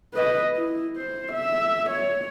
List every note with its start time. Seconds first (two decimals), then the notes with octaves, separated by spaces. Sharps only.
0.14 B4 D#5
0.56 E4
0.97 C5
1.32 E5
1.90 C#5